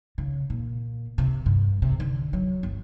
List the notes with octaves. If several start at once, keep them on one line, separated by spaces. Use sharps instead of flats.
C#3
A#2
C3
G2
C3
D3
F#3
G1